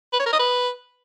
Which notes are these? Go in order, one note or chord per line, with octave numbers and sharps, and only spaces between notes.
B4
C#5
A#4
D#5
B4